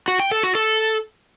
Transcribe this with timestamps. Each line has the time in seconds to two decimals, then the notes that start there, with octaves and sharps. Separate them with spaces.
0.08 F#4
0.20 G5
0.31 A4
0.43 F#4
0.55 A4